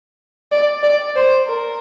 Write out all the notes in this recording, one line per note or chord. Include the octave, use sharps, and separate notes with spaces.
D5
D5
C5
A#4